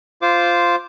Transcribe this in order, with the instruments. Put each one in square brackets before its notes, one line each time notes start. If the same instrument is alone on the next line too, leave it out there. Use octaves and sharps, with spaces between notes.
[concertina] F4 C5 D6